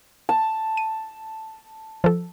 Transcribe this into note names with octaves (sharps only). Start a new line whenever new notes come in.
A5
D#7
F3 A4